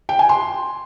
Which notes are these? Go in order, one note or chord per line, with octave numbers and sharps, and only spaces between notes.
G5
G#5
C6